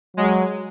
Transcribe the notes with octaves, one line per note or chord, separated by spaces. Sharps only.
F#3 G#3